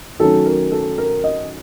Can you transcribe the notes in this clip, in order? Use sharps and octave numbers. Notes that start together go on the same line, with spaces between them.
D#3 F#3 A3 C#4 A4
A#4
A4
A#4
D#5